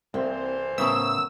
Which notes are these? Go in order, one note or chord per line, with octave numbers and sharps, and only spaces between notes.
C2 E3 A#3 C4 A4 C5
A2 C#3 B3 C#4 E4 A#4 E6